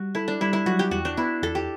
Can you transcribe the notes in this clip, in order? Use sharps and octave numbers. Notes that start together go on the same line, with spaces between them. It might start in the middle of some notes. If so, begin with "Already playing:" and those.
Already playing: G3 F#4
E4 A4
D4
G3 E4
E4
F#3 F#4
G4
E2 F#4
D4
B3 E4
E2 A4
G4